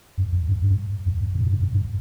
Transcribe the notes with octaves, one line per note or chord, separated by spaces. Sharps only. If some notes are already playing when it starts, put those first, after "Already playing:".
F#2
F2
G2
G2
F2
F#2
B2
G2
F#2
G2